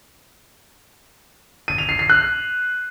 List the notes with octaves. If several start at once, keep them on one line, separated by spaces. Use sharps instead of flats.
D#7
F7
C7
C7
F#6